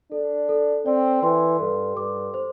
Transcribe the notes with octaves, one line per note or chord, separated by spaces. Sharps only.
D4 A4
A4
C4 D5
E3 C6
G2 A4
G2 D6
C5